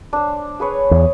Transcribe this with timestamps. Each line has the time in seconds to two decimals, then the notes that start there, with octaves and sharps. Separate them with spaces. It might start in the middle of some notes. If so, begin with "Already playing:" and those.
0.13 D4 C5
0.60 G#4 B4 C#5
0.91 E2